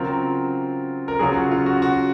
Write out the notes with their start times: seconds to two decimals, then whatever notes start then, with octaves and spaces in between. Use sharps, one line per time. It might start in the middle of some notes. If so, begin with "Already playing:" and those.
Already playing: C#3 F#3 C4 F4 A#4
1.08 A#4
1.19 C#3 F#3 C#4 F4 G#4
1.36 F#4
1.52 F4
1.66 F#4
1.82 F#4